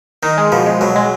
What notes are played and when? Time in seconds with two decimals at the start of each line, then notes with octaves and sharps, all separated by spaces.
0.23 D#3 D#4
0.38 G#3
0.52 B2 F3
0.66 G#3
0.81 B2 F#3
0.96 G#3